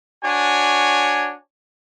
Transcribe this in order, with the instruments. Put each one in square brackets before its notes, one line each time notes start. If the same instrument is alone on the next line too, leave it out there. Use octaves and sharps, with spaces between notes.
[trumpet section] D4 F#4 C#5 G#5